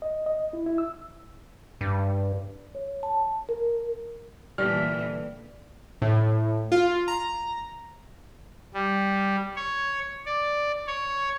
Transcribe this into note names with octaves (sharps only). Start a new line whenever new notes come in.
D#5
D#5
E4
E4
E6
G2
C#5
A5
A#4
A#2 D3 E3 G3 A3 F6
A2
F4
A#5
G3
C#5
D5
C#5